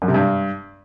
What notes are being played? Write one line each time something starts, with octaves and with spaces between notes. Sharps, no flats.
F#2
C3
G2